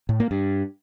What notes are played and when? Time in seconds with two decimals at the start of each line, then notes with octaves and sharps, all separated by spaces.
0.09 A2
0.20 A#3
0.31 G2